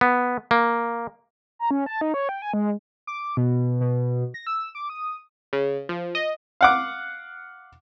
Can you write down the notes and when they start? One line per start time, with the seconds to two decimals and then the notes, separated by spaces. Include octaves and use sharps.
0.01 B3
0.51 A#3
1.59 A#5
1.71 C#4
1.86 A5
2.01 D#4
2.14 C#5
2.29 G5
2.42 G#5
2.54 G#3
3.07 D6
3.37 B2
3.81 B2
4.34 A#6
4.47 E6
4.75 D6
4.90 D#6
5.53 C#3
5.89 F3
6.15 D#5
6.61 F5 F#5 D6